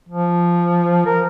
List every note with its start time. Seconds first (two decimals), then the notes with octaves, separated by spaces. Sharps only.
0.09 F3
1.06 A#4